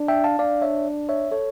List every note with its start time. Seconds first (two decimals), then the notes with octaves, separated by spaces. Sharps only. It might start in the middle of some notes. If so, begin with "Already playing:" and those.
Already playing: D4
0.08 E5 G5
0.24 F5 A5
0.39 D4 D5 F5
0.62 C#5 E5
1.09 C#5 E5
1.31 A4 C#5